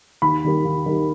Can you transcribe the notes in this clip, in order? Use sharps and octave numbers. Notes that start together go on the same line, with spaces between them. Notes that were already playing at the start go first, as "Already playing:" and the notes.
D#2 B5
D#3 G3 A#3
D#2
D#3 G3 A#3